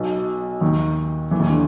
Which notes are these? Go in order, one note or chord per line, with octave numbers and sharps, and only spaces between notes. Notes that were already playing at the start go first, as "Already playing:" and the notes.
Already playing: B1 B2
D#2 D#3
E2 E3
D#2 D#3
D3